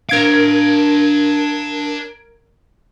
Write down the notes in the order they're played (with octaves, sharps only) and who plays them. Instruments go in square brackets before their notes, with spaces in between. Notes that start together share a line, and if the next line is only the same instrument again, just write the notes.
[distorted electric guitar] D4 F5 [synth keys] A#4 G#6 D7